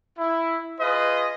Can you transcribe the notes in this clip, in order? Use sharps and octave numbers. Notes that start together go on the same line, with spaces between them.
E4
F4 G#4 B4 D#5